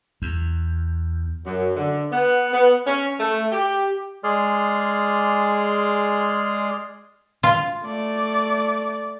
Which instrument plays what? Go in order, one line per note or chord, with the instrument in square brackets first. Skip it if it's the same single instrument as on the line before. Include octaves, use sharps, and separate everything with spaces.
[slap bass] E2
[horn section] F#2
D3
B3
B3
C#4
A3
G4
[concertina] G#3 G#4 D5 C6 F6
[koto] F4
[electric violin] A3 D5